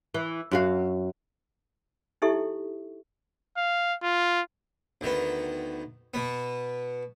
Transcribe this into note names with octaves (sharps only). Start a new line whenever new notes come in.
E3
F#2 F#4 F5
D#4 E4 G4 A4 E5 C#6
F5
F4
D2 D#3 B3
B2 B3